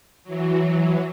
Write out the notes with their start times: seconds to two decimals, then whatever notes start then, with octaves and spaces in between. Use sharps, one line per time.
0.24 E3 F#3